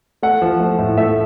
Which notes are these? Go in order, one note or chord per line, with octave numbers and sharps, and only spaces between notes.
A3 F#5
F3
A3
A2
A3 E5